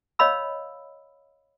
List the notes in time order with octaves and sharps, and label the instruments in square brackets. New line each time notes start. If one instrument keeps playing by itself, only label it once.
[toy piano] C#5 D#5 F5 B5 E6